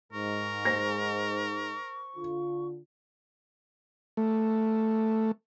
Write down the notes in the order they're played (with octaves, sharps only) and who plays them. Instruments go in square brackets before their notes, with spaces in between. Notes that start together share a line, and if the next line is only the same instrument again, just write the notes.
[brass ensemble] G#2 [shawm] A#4 [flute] C#6
[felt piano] C5 A#6
[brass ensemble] D3 F4
[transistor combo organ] A3